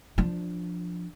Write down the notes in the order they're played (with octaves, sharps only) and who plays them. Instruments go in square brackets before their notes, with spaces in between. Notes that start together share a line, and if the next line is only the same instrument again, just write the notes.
[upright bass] F3 D4